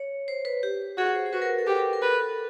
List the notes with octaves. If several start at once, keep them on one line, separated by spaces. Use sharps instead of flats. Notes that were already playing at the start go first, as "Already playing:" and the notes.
Already playing: C#5
C5
B4
G4
F#4 G#4
C5
C5
F#4 B4
A#4
A4
G4 A#4
A#4
A4 B4
A4